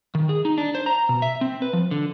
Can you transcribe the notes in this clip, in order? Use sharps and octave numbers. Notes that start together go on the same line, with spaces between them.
D#3
G#4
D#4
D4
C5
A#5
B2
E5
C4
B4
F3
D3